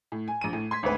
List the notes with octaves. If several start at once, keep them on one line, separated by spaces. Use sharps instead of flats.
A2
G#5
A#1 D#7
A2
C6 G#6 B6
G#1 D2 B4